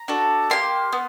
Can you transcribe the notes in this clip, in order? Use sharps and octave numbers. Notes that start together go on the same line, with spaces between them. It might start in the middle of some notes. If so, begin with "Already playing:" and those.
Already playing: A#5
D4 F#4 A4
A#3 D4 G4 C6
B3